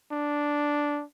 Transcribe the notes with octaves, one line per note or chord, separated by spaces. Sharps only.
D4